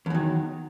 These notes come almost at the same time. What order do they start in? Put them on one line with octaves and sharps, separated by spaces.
E2 F#3 D#3